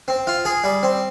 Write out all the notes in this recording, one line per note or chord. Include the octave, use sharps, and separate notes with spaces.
C4
F4
G#4
G3
C4